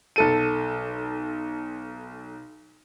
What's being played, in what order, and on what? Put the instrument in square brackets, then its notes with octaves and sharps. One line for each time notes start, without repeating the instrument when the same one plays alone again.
[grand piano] B1 A4 D#7